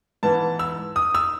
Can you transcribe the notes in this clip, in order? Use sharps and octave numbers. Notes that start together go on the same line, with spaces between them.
G#2 E3 B3 A5
E6
D#6
E6